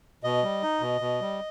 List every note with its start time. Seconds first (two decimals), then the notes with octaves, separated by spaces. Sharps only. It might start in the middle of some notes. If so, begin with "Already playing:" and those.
0.24 B2 D#5
0.43 G3
0.63 D#4
0.81 B2
1.01 B2
1.21 G3